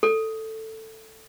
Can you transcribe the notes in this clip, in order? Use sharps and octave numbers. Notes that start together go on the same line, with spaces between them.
A4